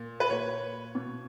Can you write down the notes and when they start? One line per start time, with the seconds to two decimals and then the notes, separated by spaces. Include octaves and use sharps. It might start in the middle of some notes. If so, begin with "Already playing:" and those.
Already playing: A#2
0.20 B4
0.29 A#2 C#5
0.95 B2